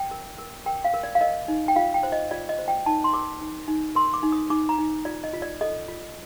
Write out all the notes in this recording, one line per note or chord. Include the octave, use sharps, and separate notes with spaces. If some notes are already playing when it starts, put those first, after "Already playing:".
Already playing: G5
A#4
A#4
A#4 G5
F5
A#4
D5
F5
A#4 D#5
D#4
G5
F4 F5
G5
C5
D#5
F4 D5
D#5
C5
G5
D#4 A5
C6
A#4 D6
D#4
D#4
A#4 C6
D6
D#4
D#6
D#4 D6
A#5
D#4
F4 D5
D#5
F4
D5
A4 D#5
F4